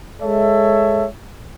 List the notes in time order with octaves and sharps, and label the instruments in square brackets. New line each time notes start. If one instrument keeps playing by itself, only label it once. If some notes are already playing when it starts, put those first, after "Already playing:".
[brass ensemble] G#3 A4 C#5 E5